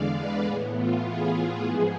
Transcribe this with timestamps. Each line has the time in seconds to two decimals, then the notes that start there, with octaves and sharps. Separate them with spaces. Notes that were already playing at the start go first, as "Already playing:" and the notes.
Already playing: E2 D3 G#3 D5 F5
0.15 B4
0.45 A2 E3 B3 G#4
0.76 F4
1.06 G#4
1.66 G#2 F3 G#3 B3